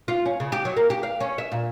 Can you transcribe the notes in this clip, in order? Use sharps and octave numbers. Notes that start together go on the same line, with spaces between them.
F4
C#4
C#3
G4
F#3
A#3
G4
F5
C#4
E5
A#2